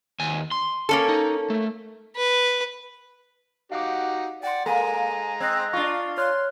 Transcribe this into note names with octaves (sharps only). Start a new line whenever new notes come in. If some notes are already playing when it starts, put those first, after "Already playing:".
D#2 G#5
C6
A#3 C#4 A4
D#4
A3
B4
D#4 F#4 G4 F5 F#5 D6
D5 F#5 G5 C6
G#3 A#3 A4 G#5 A#5
C4 D#5 D#6 F#6 G#6
D4 F4 C#6
C#5 C6 F6 F#6